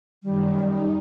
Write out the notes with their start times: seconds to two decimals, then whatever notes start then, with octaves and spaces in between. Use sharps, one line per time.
0.23 F#2 D#3 G3
0.63 D#4